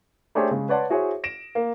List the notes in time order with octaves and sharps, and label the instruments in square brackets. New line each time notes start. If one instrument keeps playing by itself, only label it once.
[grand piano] A3 D4 G4 G#4 C5 C#5
C#3 G#3
B4 C#5 D5 F#5 A5 C6
E4 F#4 G#4 C5 C#5 E5
A#6 D7 E7
A#3